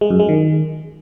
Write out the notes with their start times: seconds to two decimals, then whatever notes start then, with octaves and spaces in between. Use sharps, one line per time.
0.01 G#3
0.10 F#2
0.20 G#3
0.29 D#3